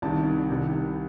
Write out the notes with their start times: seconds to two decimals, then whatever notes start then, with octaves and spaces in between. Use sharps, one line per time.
0.02 C2 C3 D#3 A5
0.50 C2 C3 D#3